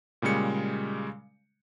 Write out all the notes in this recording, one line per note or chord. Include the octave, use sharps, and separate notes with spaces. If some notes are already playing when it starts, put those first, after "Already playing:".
A#2 C#3 G3 G#3 C#7